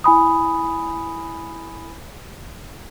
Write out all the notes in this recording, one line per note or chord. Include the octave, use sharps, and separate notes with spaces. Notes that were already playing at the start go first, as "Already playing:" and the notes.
E4 G#5 B5 D#6